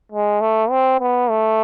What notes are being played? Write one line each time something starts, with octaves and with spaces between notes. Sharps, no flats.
G#3
A3
C4
B3
A3